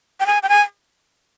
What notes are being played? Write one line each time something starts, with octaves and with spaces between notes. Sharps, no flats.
G5
G#5
G5
G#5